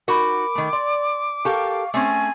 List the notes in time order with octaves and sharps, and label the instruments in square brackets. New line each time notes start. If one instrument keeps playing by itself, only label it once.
[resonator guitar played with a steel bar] D#4 F#4 F#5 [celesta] A#4 B5 [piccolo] D6
[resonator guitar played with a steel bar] D#3 A3
[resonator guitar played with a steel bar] D5 [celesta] C6
[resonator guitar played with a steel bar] G4 A4 A#4 [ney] F5 [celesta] C#6
[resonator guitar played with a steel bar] A3 C4 C#4 [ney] G#5